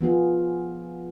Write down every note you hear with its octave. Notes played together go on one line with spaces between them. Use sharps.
F3 B3 F4 G#4